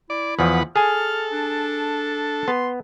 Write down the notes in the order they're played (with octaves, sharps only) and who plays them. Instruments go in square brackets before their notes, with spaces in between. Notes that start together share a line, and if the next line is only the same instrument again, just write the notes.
[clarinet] E4 [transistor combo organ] D5
[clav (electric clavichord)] E2 F3 [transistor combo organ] B4 F#5
[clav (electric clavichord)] G#4 G#5 [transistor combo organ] A4 [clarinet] F6
[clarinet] D4
[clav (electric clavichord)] B3 [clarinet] C6